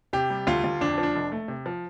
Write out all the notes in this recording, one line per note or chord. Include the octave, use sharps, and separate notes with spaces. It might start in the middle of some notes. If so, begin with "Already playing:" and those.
C3 G4
G3
D2 F4
D2
F2 D4
F3
D4
F1
A3
C3
F3